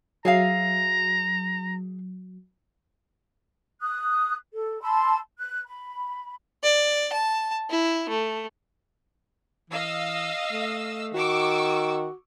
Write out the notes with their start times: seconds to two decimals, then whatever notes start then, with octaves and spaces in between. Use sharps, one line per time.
0.25 F#3 G#4 E5 F5 A#5
3.81 D#6 F#6
4.52 A4
4.81 A5 B5 C6 E6
5.38 F#6
5.66 B5
6.63 D5
7.12 A5
7.70 E4
8.09 A3
9.70 E3 D#5 F5 E6
10.52 A3
11.14 D#3 F#4 C#6 D6 E6